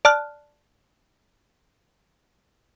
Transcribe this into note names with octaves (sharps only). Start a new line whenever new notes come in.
D5 A5 F6 F#6